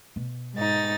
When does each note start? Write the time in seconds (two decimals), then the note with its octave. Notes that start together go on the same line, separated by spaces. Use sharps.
0.16 B2
0.55 G#2 D#4 A6